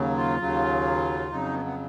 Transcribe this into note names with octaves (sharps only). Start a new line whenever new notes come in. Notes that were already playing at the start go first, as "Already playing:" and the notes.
Already playing: D#2 C#3 F#3
F4
D#2 C#3 F#3
F2 C#3 F#3 D#4
B3
B3